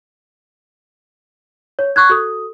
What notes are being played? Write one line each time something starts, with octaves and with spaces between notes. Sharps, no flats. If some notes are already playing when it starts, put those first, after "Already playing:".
C#5
C#6 F#6 G#6
F#4 A4 D#6